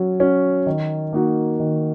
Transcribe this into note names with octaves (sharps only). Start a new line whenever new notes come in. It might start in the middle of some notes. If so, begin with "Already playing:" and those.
Already playing: F#3 C#4
C#4 F#4
D#3
A#3 D#4 F#4
D#3